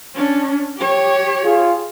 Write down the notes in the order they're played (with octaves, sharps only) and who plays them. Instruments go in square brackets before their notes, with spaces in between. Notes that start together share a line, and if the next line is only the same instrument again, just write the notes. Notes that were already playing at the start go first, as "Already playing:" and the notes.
[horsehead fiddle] C#4 D4
G4 C#5
[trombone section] F4 G#4